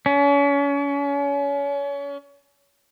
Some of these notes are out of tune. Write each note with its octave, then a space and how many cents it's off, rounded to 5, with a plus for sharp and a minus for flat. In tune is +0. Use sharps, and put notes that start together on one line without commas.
C#4 +35